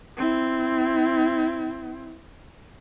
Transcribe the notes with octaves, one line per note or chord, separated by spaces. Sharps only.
C4 E4